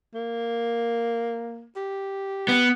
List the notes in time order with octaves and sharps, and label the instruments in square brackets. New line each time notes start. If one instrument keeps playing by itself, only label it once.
[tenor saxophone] A#3
G4
[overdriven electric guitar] B3